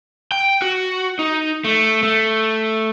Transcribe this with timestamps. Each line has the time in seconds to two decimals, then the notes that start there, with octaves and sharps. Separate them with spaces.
0.32 G5
0.62 F#4
1.19 D#4
1.65 A3
2.03 A3